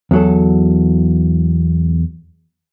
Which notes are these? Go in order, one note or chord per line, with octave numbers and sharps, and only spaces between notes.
E2 F#3 A4